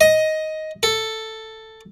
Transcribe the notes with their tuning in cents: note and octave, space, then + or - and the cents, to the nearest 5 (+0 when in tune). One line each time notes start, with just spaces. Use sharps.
D#5 +10
A4 +5